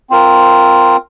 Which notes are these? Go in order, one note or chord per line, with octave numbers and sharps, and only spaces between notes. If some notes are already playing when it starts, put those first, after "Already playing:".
C4 F4 A#4